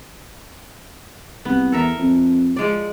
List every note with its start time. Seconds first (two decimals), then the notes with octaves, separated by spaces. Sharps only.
1.45 C2 B3
1.72 E2 A4 A#4 E5
1.98 F2
2.56 F3 G#3 D5